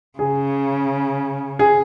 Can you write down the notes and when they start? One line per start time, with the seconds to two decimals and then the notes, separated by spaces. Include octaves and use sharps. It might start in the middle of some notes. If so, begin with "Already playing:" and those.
0.19 C#3 G#4
1.59 G#4